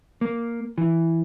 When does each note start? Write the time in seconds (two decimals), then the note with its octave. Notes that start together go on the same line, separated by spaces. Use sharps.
0.21 A#3
0.78 E3